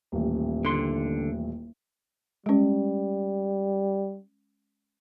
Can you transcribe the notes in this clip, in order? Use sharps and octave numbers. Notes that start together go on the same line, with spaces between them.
D#1 A1
D3 C6
G3 G#3 C#4